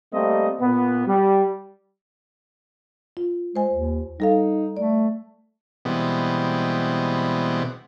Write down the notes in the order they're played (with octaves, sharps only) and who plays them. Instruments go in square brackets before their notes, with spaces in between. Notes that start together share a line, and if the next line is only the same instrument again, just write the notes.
[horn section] G3 A3 A#3 C4 D#5
A#2 B3
G3
[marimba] F4
[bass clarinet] G#3 [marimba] C5 G#5
[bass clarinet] D#2
[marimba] G3 A4 F5 [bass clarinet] D#4
[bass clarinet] A3 [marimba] D5
[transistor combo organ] B2 E3 G3 G#3 B3 C4